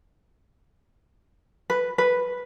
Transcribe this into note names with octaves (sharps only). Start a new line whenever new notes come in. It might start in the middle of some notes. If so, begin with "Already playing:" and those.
B4
B4